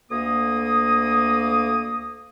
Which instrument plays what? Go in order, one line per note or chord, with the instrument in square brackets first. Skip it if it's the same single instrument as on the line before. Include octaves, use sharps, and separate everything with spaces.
[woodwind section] D2 A#3 D#6